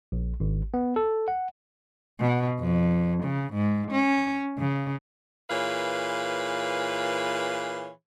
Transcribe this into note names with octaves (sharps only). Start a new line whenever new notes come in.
A#1
G#1
B3
A4
F#5
B2
F2
C#3
G#2
C#4
C#3
A#2 E3 G#4 B4 C#5 F5